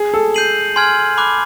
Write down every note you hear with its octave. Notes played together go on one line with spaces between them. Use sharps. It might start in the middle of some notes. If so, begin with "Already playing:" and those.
Already playing: G#4
A4
G6 C7 D#7 F#7
G#5 C6 F6 G#6
B5 D6 F#6